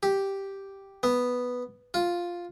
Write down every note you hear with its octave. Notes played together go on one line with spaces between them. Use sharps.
G4
B3
F4